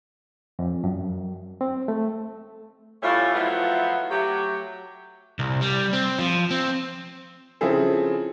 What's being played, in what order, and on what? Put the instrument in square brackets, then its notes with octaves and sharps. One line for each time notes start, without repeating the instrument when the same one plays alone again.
[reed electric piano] F2
F#2
C4
A3
[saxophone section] A2 G3 A3 C#4 E4 F4
F3 F#3 A3 B3 E4 F4
F#3 A3 G4
[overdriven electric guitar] C2
G3
C4
F3
C4
[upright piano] C#3 F3 C4 E4 G#4 A4